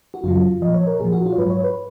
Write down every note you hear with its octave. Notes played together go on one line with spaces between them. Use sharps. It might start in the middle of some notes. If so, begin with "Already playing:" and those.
F#4
F#2 C#3 F#3 F4
A#2 F3 D#5
C#5
A#4
A#2 F3 G#4
F#4
F4
C#5
G#2 F#3 B4
C#5
B4